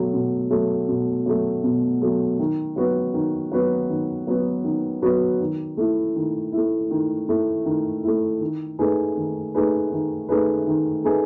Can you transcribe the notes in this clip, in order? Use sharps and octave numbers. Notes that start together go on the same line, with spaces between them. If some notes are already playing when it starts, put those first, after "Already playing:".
Already playing: B2 F#3 A3
B2
F#3 A3
B2
F#3 A3
B2
F#3 A3
D#3
F#3 B3 F#4 B4
D#3
F#3 B3 F#4 B4
D#3
F#3 B3 F#4 B4
D#3
F#3 B3 F#4 B4
D#3
A3 E4
D#3
A3 E4
D#3
A3 E4
D#3
A3 E4
D#3
A3 D#4 G#4 B4
D#3
A3 D#4 G#4 B4
D#3
A3 D#4 G#4 B4
D#3
A3 D#4 G#4 B4